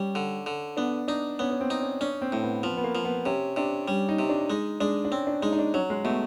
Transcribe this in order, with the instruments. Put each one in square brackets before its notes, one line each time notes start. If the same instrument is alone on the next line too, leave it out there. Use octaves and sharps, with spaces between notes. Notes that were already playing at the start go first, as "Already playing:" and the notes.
Already playing: [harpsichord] G3 [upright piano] C#4
[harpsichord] D3
D3
[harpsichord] B3 [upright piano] D4
[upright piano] D4 [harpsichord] D#4
[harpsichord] B3 [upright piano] C#4
[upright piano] C#4
C4
[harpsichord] D#4
[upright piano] C#4
[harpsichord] C#4 [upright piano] D4
[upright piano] C4
[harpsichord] A2
[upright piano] B3
[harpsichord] F3 [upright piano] B3
[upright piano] B3
A#3
[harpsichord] F3
[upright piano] B3
[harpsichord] C3 [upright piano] C#4
[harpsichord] C3 [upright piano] D4
[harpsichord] G3 [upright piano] C#4
[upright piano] D#4
[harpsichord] C3
[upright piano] D4
[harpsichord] G#3 [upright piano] D#4
[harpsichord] G#3 [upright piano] D4
[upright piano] D4
[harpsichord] C4 [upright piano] C#4
[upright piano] D4
[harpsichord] G#3 [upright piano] D#4
[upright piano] D#4
D4
[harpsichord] F#3 [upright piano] C#4
[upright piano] G#3
[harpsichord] B2 [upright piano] A3